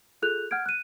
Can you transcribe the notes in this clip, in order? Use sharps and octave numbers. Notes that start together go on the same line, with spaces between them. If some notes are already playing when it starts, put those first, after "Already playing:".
F4 G#4 A4 F#6 G6 F7
F#5 F6 G6 G#6 D7
F#6 D#7